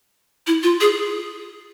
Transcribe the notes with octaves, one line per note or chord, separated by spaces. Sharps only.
E4
F4
G#4